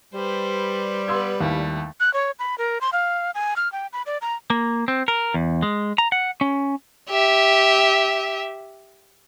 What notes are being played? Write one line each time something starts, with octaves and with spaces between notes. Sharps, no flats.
G3 B4 C5
B3 B4 C6 E6 G#6
D#2 A3 E4
F#6
C#5
B5
A#4
C6
F5
G#5
F6
G5
B5
D5
A#5
A#3
C4
A#4
E2
G#3
A#5
F#5
C#4
G4 E5